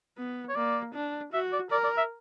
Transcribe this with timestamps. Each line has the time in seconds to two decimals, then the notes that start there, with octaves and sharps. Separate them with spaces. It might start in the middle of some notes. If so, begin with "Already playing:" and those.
0.18 B3
0.49 C#5
0.55 A#3 D5
0.94 D4
1.33 F#4 E5
1.53 D5
1.71 A#4 D5
1.84 D5
1.97 E5